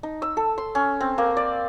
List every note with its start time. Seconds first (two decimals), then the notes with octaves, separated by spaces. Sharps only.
0.03 D#4
0.22 E6
0.37 A4
0.58 C6
0.75 C#4
1.01 C4
1.18 A#3
1.37 D5